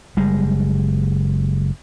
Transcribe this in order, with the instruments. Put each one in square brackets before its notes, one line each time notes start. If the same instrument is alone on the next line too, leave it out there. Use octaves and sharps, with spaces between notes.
[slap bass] F#1 G3 G#3